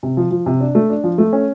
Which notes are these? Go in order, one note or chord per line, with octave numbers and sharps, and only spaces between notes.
C3
F3
F3
C3
D4
A3
D4
F3
A3
C#4